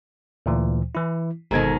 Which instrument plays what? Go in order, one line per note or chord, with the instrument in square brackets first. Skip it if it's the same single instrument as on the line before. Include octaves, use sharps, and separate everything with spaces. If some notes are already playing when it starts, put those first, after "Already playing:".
[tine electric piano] D2 A#2 E3
E3 E4
[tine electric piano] G1 A4 G#6 [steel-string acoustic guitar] G#2 B2 D#3